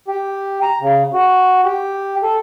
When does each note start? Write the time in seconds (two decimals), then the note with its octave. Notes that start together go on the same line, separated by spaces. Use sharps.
0.08 G4
0.62 A#5
0.81 C#3
1.13 F#4
1.65 G4
2.23 A4